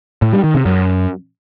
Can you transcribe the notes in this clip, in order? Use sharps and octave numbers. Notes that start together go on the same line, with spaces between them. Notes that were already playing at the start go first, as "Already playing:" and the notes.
A2
G3
D#3
C3
F#2